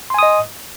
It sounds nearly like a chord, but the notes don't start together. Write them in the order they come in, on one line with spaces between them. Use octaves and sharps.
C6 G#5 D#6 D#5